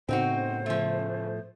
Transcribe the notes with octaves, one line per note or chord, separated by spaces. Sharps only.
A2 C#3 B3 C4 D#4 F#4 C5
F3 A3